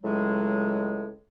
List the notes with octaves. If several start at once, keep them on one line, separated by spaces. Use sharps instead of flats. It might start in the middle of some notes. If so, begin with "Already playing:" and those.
C#2 A2 F#3 G#3